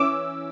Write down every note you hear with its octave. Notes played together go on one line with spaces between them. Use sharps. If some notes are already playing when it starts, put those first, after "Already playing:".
Already playing: E3 C#4 D6 E6